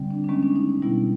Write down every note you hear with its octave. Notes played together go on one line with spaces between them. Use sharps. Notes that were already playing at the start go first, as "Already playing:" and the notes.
Already playing: D3 G3 C4
D4
D4
D#3 G#3 B3 C#4
D4
D#4
D4
B2 G3 B3 E4